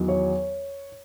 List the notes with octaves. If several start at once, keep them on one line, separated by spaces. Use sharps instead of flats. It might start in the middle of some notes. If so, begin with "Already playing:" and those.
Already playing: E2 D#3 F#3
C#5